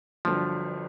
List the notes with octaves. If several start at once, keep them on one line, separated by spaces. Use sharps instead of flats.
G1 G2 D3 F3 F#3